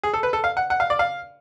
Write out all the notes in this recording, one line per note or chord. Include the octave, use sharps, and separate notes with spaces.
G#4
A4
B4
A4
F5
F#5
F#5
F5
D5
F5